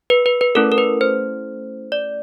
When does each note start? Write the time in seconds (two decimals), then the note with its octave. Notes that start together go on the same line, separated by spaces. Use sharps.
0.10 B4
0.26 B4
0.41 B4
0.55 A3 C#4 E4 A4 A#4
0.72 A#4
0.78 B4
1.01 C5
1.92 D5